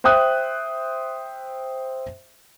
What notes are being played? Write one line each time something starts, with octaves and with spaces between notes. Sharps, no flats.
C5 E5 G5 D#6 F#6